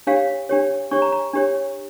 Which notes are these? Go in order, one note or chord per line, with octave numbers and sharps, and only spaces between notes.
D4 G4 C#5 F5
D4 G4 C#5
D4 G4 C#5 C#6
A#5
A#5
D4 G4 C#5